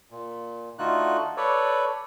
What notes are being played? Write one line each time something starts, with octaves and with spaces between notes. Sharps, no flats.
A#2
D3 A3 D#4 F4 F#4 F#6
A4 B4 C#5 D5